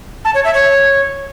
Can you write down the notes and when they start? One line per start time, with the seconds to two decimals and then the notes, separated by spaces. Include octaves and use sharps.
0.25 A5
0.35 C#5
0.44 E5
0.54 C#5